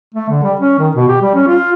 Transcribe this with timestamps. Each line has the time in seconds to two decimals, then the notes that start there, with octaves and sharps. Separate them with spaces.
0.14 A3
0.29 D3
0.44 G3
0.60 C#4
0.79 D#3
0.96 B2
1.09 G4
1.22 G3
1.34 C#4
1.47 F4